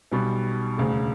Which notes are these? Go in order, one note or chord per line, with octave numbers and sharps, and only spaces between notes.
B1 B2 G3
E1 D2 C#3